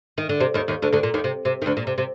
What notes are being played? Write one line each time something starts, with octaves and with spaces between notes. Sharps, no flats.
D#3
D3
C3
D#2 D#3
D#2 D#3
D2 D3
D2 D3
A#2
D#2 D#3
C3
C3
D#3
D2 D3
A#2
C3
C3